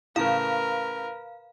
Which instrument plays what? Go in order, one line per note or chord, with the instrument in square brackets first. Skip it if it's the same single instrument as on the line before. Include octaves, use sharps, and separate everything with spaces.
[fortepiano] A2 C#3 [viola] A#4 B4 [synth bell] F5